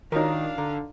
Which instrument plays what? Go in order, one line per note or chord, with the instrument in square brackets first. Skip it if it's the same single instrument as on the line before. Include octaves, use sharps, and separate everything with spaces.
[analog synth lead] D#3 [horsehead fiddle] D4 F5 [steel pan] D#4 A#4 [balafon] F4 F#4 C#5
[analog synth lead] D3 [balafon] A#5